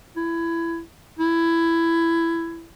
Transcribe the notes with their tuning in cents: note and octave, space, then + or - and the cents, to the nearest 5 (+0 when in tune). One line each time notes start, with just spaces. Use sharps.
E4 +20
E4 +15